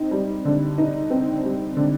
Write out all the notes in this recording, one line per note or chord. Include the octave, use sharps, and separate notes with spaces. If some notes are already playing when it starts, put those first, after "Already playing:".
Already playing: C4 D#4
G3
D3
D#4
C4
G3
D3